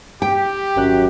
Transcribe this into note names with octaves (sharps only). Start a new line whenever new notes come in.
G4 G5
G#1 F#2 F#3 F#6